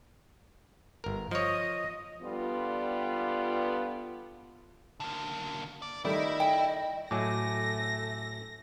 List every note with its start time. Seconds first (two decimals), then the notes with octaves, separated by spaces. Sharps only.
1.04 G1 A#4
1.31 F3 C#5 D#5
2.22 D3 G3 B3 F4
5.00 D3 A#3
5.82 D5
6.05 D#3 G3 A3 E4 D#5
6.40 G5
7.11 A2 F#3 A3 G#5 D6 A#6